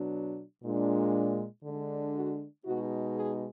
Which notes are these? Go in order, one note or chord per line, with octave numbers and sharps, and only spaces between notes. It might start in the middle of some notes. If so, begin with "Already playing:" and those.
Already playing: B2 F#3 D4
A#2 G#3 D4
D3 G#3 D4
F#4
B2 G#3 D#4 F#4
G#4